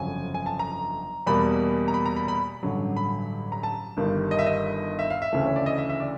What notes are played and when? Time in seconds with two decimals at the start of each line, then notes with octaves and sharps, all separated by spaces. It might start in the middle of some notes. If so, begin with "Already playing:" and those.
Already playing: G1 F2 C#3 F#3 G#5
0.34 G#5
0.46 A5
0.59 A#5
1.26 E2 B2 G3 A#3 B5
1.88 A#5
1.94 B5
2.06 A#5
2.16 B5
2.28 B5
2.63 A1 G2 D3 F#3
2.96 B5
3.52 A#5
3.63 A5
3.97 G1 G2 D#3 G3
4.31 D#5
4.39 E5
4.46 D#5
4.99 E5
5.10 F5
5.22 E5
5.32 D2 C#3 E3 A3
5.46 C#5
5.56 D5
5.66 D#5
5.78 E5
5.89 E5
6.00 D5